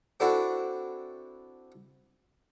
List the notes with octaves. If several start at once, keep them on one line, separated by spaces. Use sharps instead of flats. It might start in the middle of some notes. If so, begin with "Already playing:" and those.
C4 D4 E4 F#4 A4